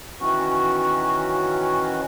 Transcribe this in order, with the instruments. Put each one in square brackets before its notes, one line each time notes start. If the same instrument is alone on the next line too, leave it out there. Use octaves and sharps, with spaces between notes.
[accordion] D#3 E3 C#4 F#4